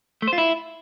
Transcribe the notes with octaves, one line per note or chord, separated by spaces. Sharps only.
A3
C5
F4
E4